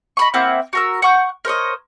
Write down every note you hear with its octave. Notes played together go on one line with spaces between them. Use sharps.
D#5 B5 C#6
A#3 C4 E4 F#5
F#4 A#4 E6
F#5 C#6 G6
A#4 C5 C#5 D#5